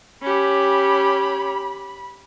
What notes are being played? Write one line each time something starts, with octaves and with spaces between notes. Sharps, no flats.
C#4 G4 B5